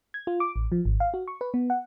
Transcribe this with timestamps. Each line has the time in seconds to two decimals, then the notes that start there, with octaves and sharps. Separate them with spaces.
0.14 G#6
0.27 F4
0.40 D6
0.56 A1
0.72 F3
0.85 G#1
1.00 F5
1.14 F#4
1.28 C#6
1.41 B4
1.54 B3
1.70 F#5